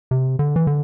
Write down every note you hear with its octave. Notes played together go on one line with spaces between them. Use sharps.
C3
D3
E3
D3